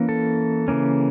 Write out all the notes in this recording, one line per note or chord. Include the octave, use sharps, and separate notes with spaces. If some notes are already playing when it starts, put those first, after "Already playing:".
Already playing: E3 A#3 C#4
A4
C#3 E3 A#3 C#4